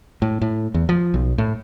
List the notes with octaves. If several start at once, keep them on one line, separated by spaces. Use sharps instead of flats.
A2
A2
E2
F3
B1
A2